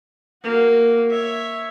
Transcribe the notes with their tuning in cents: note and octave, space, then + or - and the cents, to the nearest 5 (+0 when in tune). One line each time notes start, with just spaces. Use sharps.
A#3 -5 F#4 +0
C#5 +0 E5 +0